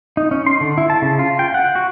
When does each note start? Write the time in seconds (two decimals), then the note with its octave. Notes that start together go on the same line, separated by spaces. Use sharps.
0.17 D#4
0.31 C#4
0.47 C6
0.61 D3
0.78 E4
0.90 A5
1.02 C#3
1.19 F4
1.39 G5
1.54 F#5
1.75 F#4